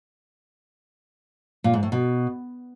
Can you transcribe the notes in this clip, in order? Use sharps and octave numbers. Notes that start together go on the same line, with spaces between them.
A#2
G#2
A2
B2